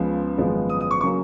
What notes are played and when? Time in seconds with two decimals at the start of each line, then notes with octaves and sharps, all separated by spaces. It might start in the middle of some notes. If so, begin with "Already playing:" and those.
Already playing: C#2 C#3 F3 B3
0.38 G#1 F#2 F3 G#3 B3
0.70 D#6
0.81 D#6
0.91 C#6
1.01 C#3 F#3 A#3 C#6